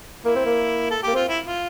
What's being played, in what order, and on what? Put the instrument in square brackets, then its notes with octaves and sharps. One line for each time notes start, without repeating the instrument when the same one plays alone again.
[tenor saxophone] A#3 [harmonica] E4
[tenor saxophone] C4
A#3
[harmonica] A4
[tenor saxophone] A#3 [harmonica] G4
[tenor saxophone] C4 [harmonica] F4
[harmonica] E4
F4